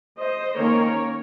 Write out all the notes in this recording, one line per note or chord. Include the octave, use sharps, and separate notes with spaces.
C5 D#5
D#3 A#3 C#4 A#4 C#5